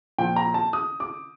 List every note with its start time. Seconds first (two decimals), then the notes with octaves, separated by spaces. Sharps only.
0.18 A#2 F3 G5
0.36 A#5
0.54 A5
0.73 D#6
1.00 D6